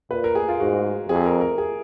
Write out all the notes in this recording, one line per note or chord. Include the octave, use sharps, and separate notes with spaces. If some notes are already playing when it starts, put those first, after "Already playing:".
A#2 B4
A#4
G#4
F4
G#2 F#4
F2 G#4
A#4
A#4
G#4